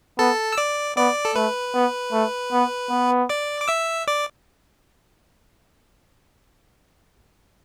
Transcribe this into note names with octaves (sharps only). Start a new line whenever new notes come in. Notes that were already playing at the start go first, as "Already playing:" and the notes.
B3 A4 A5
E6
D5 D6
B3 D5 D6
A4
A3 B4
B3
A3
B3
B3
D5 D6
D6
E5 E6
D5 D6